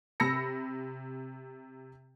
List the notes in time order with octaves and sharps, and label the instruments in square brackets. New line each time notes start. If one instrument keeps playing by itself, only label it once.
[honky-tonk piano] C3 B5 E6 A#6 C#7